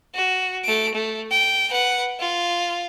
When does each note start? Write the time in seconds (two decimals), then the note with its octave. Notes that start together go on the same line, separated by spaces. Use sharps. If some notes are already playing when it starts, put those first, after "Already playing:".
0.14 F#4
0.64 A3 D7
0.94 A3
1.31 G5
1.70 B4 F#5
2.20 F4